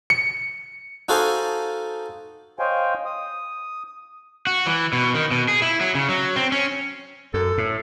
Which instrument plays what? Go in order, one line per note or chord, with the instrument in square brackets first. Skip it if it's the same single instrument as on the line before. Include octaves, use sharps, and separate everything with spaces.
[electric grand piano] C#7
[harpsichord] D#4 F#4 A4 C5 F5 G#5
[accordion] C5 C#5 D#5 F5 G5 G#5
D#6
[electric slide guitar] F#4
E3
B2
D#3
B2
G#4
E4
F#3
C#3
F#3
C4
C#4
[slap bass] F#2 [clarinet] A4
[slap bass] A2